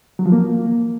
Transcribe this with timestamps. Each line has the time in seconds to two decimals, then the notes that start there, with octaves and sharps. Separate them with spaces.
0.19 F#3
0.26 F3
0.32 A#3